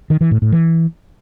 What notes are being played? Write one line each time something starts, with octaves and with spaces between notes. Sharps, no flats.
D#3
E3
A2
A2
E3